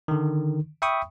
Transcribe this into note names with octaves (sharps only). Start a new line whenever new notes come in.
D3 D#3
E5 G5 B5 C#6 D#6